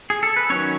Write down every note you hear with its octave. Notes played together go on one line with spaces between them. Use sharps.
G#4
A4
B4
D#3 F#3 C#4 C#5